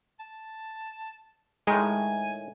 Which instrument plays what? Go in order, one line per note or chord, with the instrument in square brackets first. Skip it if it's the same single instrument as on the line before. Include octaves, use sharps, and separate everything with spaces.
[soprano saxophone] A5
[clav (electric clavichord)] A2 D#3 D#4 [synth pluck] G#3 [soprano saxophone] G#5